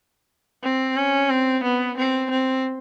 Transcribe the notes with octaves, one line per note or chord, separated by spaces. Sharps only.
C4
C#4
C4
B3
C4
C4